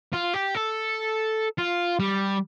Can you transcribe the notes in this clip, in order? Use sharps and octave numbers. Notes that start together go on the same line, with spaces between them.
F4
G4
A4
F4
G3